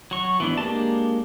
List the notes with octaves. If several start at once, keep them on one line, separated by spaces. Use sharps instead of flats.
F#3 C#6
E3 B3 D4
G#3 A#3 D4 G4 A5